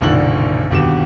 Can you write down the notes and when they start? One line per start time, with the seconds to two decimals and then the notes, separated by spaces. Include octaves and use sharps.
0.01 F#1 B1 A#2 D3 D#3 F#7
0.71 G1 D#2 B2 G4 D6 E7